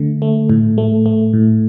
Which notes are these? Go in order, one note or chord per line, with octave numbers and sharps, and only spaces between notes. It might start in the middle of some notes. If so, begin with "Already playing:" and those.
Already playing: D3 A3
A3
A2
A3
A3
A2